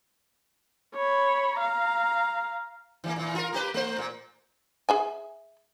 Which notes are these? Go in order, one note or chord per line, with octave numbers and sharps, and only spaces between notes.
C#5 B5
F5 A#5
E3 F#3 A#3
A#2 E3
F4 A#4
A#3 G4 B4
A3 C5
A#2
G#4 E5 G#5